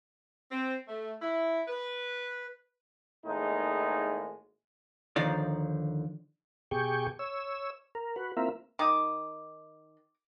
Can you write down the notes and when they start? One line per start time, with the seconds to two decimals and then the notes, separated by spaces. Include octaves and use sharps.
0.51 C4
0.87 A3
1.21 E4
1.68 B4
3.25 G#1 A2 G#3 A#3 D#4
5.16 D#2 D3 D#3 F3 D#4 D5
6.71 B2 G4 G#4 G5 C#6
7.19 C#5 E6
7.95 A#4
8.16 F#4 B4
8.37 A#3 C4 E4 F4 A#4 E5
8.79 D#3 D6 D#6